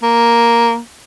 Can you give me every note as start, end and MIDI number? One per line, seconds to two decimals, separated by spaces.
0.03 0.78 58